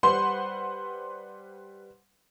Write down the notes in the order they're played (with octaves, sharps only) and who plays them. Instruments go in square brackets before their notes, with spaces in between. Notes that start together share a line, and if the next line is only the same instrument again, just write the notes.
[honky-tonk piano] G3 B4 C5 F#5 C6